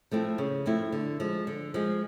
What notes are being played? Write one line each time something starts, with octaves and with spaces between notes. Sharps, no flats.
F3 A3 C4 E4
C#3
F3 A3 C4 E4
D3
F3 G#3
D3
F3 G#3